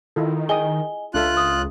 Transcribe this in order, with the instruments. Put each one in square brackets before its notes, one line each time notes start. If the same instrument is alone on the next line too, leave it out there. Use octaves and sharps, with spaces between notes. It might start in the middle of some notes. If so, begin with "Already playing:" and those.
[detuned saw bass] D#3 [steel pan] E4 F4 A4
[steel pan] G#4 G5 D#6 [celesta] D#5 G#5 G7
[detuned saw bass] C#2 [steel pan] D4 A4 E5 [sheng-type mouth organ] F4 F#6
[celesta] D#6